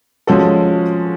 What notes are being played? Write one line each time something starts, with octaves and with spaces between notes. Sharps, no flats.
F3 G#3 C#4 F#4 A4